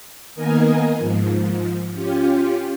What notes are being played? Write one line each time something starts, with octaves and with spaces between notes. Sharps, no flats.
D#3 A#3 B3 A#4 D#5 G#5
G#2 F3
C#4 F4 G4